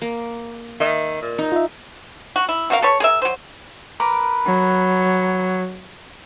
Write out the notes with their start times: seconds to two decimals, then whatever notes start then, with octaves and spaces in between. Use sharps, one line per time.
0.02 A#3
0.80 D#3 D#5 E5
1.22 A#2
1.38 D#4
1.52 F4 E5
2.36 F#4
2.49 E4
2.70 B2 F#4 A#4 F5
2.82 A4 B4 C#5
3.00 G#4 A#4 E5
3.22 F#3 C5
4.00 A#4 B4 D6
4.46 F#3